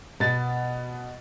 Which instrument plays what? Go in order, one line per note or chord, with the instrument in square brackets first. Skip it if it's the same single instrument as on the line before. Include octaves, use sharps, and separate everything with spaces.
[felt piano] B2 [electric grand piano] B3 A6